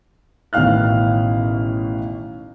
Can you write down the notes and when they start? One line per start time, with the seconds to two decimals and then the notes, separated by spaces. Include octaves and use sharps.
0.53 A1 B2 D#3 F5 F6 F#6